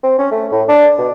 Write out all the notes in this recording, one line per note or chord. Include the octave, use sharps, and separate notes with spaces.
C4
C#4
A3
A2
D4
B2